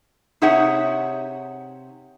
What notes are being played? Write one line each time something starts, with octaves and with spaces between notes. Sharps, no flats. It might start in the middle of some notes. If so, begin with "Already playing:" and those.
C3 D#4 G#4 C#5 E5 F#5